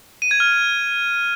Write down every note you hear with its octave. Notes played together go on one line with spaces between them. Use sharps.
D#7
G#6
F6